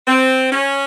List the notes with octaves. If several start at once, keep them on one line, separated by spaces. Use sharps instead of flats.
C4
C#4